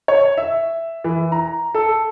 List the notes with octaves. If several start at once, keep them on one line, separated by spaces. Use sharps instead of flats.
C#5
E5
E3
A#5
A4